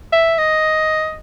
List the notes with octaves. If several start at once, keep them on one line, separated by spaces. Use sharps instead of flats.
E5
D#5